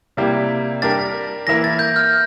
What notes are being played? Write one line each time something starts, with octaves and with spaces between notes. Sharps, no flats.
C3 G3 A#3 E4 G4
G3 D4 G4 A#4 A6
E3 A#3 E4 A#4 A#6
A6
G6
F6